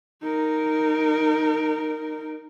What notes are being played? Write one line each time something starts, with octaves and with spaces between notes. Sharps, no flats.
D#4 A#4